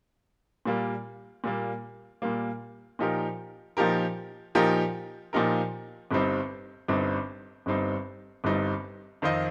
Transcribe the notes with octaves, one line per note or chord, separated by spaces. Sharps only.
A#2 G3 A#3
A#2 G3 A#3
A#2 G3 A#3
A#2 F3 D#4 G4 A#4
A#2 F3 D#4 G4 A#4
A#2 F3 D#4 G4 A#4
A#2 F3 D#4 G4 A#4
G1 G2 G3 C4 D#4
G1 G2 G3 C4 D#4
G1 G2 G3 C4 D#4
G1 G2 G3 C4 D#4
F2 D#3 C4 F4 D#5